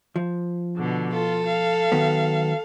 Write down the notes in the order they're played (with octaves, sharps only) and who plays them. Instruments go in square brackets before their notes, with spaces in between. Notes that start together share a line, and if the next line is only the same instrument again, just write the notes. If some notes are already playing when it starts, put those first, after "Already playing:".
[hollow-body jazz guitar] F3
[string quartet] B2 D3
[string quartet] F4 [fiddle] A4
[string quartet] F5
[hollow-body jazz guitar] D#3 F#3 B3